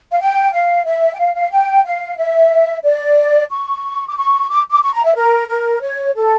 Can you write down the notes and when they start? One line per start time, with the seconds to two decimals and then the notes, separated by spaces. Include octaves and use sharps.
0.12 F5
0.20 G5
0.52 F5
0.85 E5
1.14 G5
1.19 F5
1.35 F5
1.51 G5
1.85 F5
2.18 E5
2.84 D5
3.51 C#6
4.08 D6
4.17 C#6
4.50 D6
4.71 D6
4.83 C#6
4.93 A#5
5.05 E5
5.16 A#4
5.49 A#4
5.81 C#5
6.15 A4